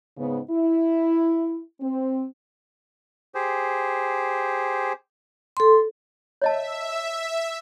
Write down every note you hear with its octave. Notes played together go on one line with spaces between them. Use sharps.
G#2 C#3 B3
E4
C4
G4 G#4 C5
A4 C6
C#5 D#5 E5 A5